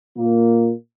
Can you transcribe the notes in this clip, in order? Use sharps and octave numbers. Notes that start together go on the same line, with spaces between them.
A#2 A#3